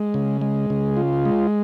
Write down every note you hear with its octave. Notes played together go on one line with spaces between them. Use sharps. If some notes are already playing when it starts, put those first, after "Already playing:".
Already playing: G#3
C#3
G#3
C#3
F4
G#3